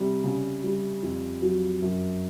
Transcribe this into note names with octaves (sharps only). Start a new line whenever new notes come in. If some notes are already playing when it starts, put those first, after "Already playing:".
Already playing: C3 G3
C#3
G3
F2
F#3
F#2